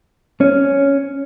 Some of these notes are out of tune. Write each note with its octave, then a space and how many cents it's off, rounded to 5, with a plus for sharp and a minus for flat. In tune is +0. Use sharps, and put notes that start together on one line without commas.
C#4 +5